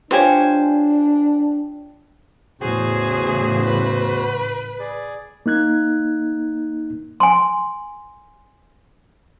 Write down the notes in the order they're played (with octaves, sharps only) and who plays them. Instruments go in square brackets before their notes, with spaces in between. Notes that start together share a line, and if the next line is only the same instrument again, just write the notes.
[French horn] D4 [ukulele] F4 G4 C#5 [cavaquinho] C5 G#5
[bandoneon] E2 F#4 C5 [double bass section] A2 C#3 E3 [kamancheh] G#4
[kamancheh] B4
[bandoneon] G#4 D5
[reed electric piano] A#3 D#4 F#6 G#6
[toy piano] G#5 C6